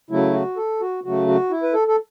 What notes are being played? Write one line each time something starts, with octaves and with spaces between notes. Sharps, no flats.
C#3 F#3 A3 E4
F#4
A4
F#4
C#3 F#3 A3 F#4
F#4
E4
B4
A4
A4